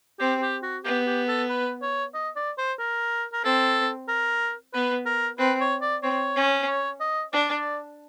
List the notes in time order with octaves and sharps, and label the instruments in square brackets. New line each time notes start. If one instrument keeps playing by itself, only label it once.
[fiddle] C4 [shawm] G4
[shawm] G4
F#4
[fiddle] B3 [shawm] G4
[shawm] G4
A4
B4
C#5
D#5
D5
C5
A#4
A#4
[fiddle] C4 [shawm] A4
[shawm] A#4
[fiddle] B3 [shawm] B4
[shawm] A#4
[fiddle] C4 [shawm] B4
[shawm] C#5
D5
[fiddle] C4 [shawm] C#5
[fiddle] C#4
[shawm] C#5
D#5
[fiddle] D4 [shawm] D5